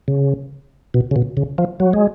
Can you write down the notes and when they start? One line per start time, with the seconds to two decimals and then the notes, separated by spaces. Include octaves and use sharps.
0.08 C#3
0.94 B2
1.11 C#3
1.16 B2
1.37 C#3
1.58 F3
1.80 F#3
1.93 G#3